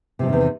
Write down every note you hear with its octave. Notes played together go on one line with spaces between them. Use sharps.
E2 G#2 C3 D#3 F3